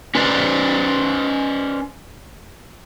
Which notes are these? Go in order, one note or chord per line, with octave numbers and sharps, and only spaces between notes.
C#4 B4 C5 D5